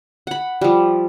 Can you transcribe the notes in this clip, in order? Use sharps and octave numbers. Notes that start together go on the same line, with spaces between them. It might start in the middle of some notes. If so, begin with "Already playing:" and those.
F#5 B5
F3 G3